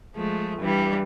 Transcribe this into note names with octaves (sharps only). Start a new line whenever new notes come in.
F3 G#3 A3
G2 E3 G3